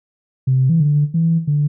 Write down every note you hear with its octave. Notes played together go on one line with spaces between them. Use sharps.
C3
E3
D3
E3
D3